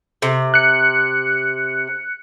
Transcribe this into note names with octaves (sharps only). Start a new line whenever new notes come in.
C3
F#6 C#7